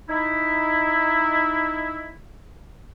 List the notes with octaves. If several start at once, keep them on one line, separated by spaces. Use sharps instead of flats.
D#4 E4